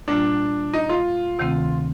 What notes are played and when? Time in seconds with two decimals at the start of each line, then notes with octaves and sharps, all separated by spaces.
0.08 A#2 G3 A#3 D4 F4
0.74 D#4
0.89 F4
1.39 D2 C3 D#3 A3 C4